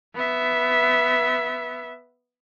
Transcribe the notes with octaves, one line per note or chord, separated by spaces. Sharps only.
B3 E5